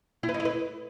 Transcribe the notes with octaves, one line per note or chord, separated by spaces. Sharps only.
E4
B4
D#4
E4
B4